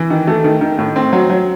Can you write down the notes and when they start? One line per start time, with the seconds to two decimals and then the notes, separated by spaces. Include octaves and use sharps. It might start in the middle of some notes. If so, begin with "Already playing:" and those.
Already playing: E3
0.10 D#3
0.27 A3
0.44 D#3
0.61 D#3
0.79 A2
0.96 C4
1.13 F#3
1.30 F#3